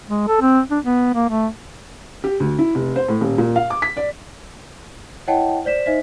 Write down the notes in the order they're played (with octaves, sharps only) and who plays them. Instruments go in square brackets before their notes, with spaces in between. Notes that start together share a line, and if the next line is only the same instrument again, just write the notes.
[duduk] G#3
A4
C4
D4
B3
A#3
A3
[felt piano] G4
D2
E4
F1
C5
A2
D#1
A#2
F5
D6
B6
D5
[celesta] E4 C#5 D#5 F#5 G5 A5
C5 D5 B6 E7
D#4 C5 D#5 E5 B6